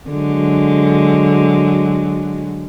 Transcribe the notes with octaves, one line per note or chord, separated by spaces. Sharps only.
D3 F#3 G#3